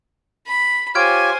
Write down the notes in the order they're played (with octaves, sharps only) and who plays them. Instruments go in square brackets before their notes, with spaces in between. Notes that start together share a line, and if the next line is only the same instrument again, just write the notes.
[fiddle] B5
[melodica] F4 G4 C#5 [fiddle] C5 G#5 [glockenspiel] F6 G#6 D7